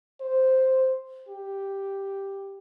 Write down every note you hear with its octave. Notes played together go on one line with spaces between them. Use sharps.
C5
G4